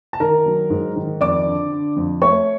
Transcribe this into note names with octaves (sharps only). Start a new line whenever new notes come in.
A5
D#3 A#4 A#5
F#3
G#2
D#3
F2 D5 D6
D3
D3
F2
A3 C#5 C#6